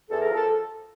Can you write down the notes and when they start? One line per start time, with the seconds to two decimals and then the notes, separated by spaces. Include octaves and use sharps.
0.09 E2 A4
0.21 A#4
0.29 F3 A4